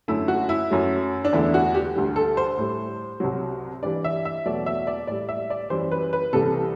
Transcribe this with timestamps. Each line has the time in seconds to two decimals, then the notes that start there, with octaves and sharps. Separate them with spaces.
0.08 F#2 D3 A3 E4
0.28 F#4
0.49 E4
0.70 F#2 F#3 A3
1.25 D4
1.33 E2 D3 A3 E4
1.54 F#4
1.75 G4
1.95 D2 D3 G3
2.16 A4
2.37 C5
2.58 A2 G3
3.20 C2 C3 F#3
3.83 G2 E3 G3 D5
4.04 E5
4.25 E5
4.46 E2 B2 F#3 A3 D5
4.66 E5
4.87 D5
5.07 A2 G3 D5
5.29 E5
5.50 D5
5.70 F#2 E3 G3 C5
5.92 B4
6.13 B4
6.33 C2 C3 E3 G3 A4